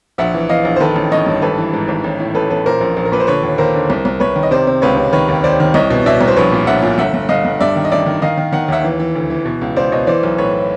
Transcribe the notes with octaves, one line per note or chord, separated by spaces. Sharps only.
A#1 E5 F#5
E3
E3 D#5 F5
A#1
C5
D#3 A4 B4
A1
A1 C#5 D#5
G2
G#1 A4 B4
E3
G#2
G#1
A1
A2
A1 A4 B4
A1 A4 B4
A#2 A#4 C5
A#1
A#1
A#4
A#2 B4
C5
D3 B4 C#5
D#2
D#2 A#4 C5
D3
C2
C2
C2 B4 C#5
D#3
D#5
C3 C5 D5
C3
C#2 B4 C#5
C3
D#3 B4 C#5
D#2
D#2 C5 D5
D#3
C2 C#5 D#5
B2
B2 D5 E5
C2
C5
A#1 B4 C#5
A#2
A#1 E5 F#5
A#2
G1 E5 F#5
G1
G1 D#5 F5
G1
G2 D5 E5
D#3
D#5
A1 D5 E5
D#3
D#3 D#5 F5
D#3
D#3 F#5
D#2 E5 F#5
E3
E3
D2
E3
B2
C#2
C#2 C5 D5
B2 C#5 D#5
E3 C5 D5
B1
A2 B4 C#5